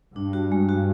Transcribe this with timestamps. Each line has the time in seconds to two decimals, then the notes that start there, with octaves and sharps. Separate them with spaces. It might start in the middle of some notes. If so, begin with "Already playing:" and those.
0.15 G2 D4
0.33 F#4
0.52 G#3
0.69 F#4